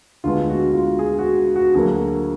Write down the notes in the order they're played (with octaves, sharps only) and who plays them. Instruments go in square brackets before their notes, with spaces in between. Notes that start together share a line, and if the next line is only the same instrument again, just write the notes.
[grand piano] D2 D3 G#3 B3 F4
F#4
F4
G#4
F#4
F#4
D2 D3 F#3 A#3 G#4